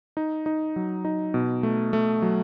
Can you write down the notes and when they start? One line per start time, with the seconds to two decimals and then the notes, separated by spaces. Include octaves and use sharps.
0.17 D#4
0.46 D#4
0.76 F#3
1.05 D#4
1.34 B2
1.63 A3
1.93 A3
2.22 F#3